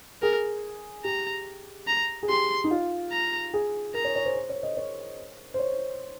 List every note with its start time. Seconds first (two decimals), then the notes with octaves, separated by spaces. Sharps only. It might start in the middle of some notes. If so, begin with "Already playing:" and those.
0.22 G#4 A#4
1.04 G4 A#5
1.87 A#5
2.23 G#4
2.29 G4 C6
2.64 D#4
2.71 F4
3.12 A#5
3.54 G#4
3.94 A#4 A#5
4.05 C#5
4.16 C#5
4.25 C5
4.35 C5
4.50 C#5
4.63 D#5
4.77 C#5
5.54 C5
5.59 C#5